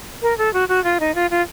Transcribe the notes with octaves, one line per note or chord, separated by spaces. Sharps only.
A#4
A4
F#4
F#4
F4
D#4
F4
F4